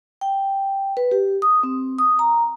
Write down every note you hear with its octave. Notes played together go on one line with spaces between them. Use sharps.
G5
B4
G4
D#6
C4
D#6
A#5